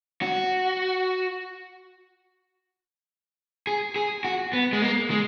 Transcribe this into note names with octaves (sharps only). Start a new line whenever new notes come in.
F#4
G#4
G#4
F#4
B3
G#3
A#3
G#3